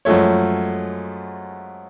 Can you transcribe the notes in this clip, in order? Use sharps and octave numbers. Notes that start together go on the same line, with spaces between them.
F#2 F3 G#3 A3 C#5